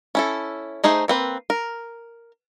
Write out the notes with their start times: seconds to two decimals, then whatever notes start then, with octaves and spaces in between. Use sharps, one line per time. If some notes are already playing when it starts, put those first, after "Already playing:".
0.15 C#4 E4 A4
0.84 A3 D#4 G#4 C5
1.08 A#3 C4 B4
1.50 A#4